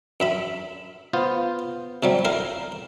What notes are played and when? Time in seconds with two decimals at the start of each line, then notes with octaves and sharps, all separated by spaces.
0.20 F#2 E5 B5
1.13 B3 F4 C5
2.03 C3 F#3 G3
2.25 E4 A#4 F5